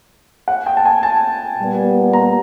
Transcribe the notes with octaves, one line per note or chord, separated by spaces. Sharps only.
F#5
G5
A5
G#5
A5
A#2 G3 B3
A#5